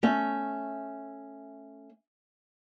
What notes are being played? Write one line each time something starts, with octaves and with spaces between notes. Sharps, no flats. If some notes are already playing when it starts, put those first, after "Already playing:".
A3 C#4 E5